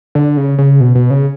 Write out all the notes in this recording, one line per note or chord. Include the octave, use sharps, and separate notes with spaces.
D3
C#3
C#3
B2
B2
C#3